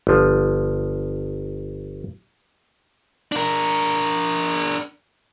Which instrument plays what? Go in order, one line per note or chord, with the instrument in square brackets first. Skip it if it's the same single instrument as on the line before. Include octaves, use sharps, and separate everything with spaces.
[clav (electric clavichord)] G1 F3
[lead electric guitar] D4 A#4